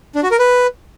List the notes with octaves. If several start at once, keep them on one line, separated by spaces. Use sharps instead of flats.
D4
F#4
A#4
B4